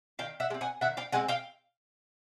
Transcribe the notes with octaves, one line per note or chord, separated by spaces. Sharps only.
D#3 F5 G5
E5 F#5
G#3
C4
F#5 G#5
D#3 E5 F#5
F5 G5
G#3 C4 F#5 G#5
F5 G5